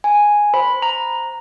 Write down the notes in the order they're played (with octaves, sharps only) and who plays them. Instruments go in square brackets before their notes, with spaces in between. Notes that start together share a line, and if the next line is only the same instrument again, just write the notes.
[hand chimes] G#5
[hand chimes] C5 [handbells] B5
[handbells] A#5